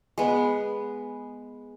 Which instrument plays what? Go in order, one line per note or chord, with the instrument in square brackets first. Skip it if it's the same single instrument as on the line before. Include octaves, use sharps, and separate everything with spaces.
[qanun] G#3 B3